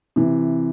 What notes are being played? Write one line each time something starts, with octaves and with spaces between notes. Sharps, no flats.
C3 E3